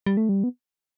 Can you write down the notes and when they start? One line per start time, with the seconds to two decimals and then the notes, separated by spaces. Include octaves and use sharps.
0.06 G3
0.17 A3
0.29 G3
0.44 B3